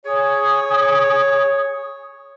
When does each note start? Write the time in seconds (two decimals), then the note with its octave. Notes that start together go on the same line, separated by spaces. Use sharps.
0.05 G#4 C#5